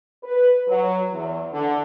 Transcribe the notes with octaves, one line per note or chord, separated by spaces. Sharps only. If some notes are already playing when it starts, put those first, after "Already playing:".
B4
F#3
E2
D3